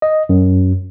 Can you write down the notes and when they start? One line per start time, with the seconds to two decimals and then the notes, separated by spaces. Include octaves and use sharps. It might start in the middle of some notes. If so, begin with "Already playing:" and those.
0.02 D#5
0.29 F#2